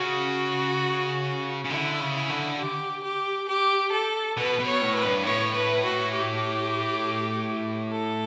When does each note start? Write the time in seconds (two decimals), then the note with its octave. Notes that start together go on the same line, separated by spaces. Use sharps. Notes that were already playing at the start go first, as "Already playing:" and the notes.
Already playing: C#3 F#4
1.64 C#3
1.70 D3 E4
2.00 C#3
2.15 E4
2.29 D3
2.59 G4
3.03 G4
3.49 G4
3.92 A4
4.37 B2 B4
4.59 B2
4.66 C#5
4.81 A2
4.96 B4
5.03 G2
5.26 A2 C#5
5.55 B4
5.85 F#4
6.14 G4
7.93 A4